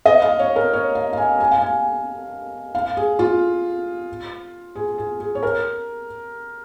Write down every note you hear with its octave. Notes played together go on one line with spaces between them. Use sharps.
D#5
F5
C#5
A#4
C#5
F5
F5
G#5
G#5
F5
G#5
F5
G#4
F4
G#4
G#4
G#4
C#5
A#4